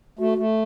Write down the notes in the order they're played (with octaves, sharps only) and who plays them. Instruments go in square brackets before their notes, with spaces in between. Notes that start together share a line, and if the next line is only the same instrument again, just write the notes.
[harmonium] A3 [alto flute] F#4
[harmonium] A3